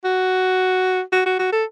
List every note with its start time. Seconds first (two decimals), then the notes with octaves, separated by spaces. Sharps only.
0.04 F#4
1.12 F#4
1.26 F#4
1.39 F#4
1.52 A4